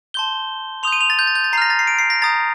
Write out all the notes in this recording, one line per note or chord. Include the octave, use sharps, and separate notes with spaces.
A5 C6 G6 G7
C6 D#6 G6 F7
D#7
F7
A6
G6
A6
G6
A6
A#5 F6 A#6 C7
A6
C7
D7
C7
A#6
A#5 D#6 G6 A6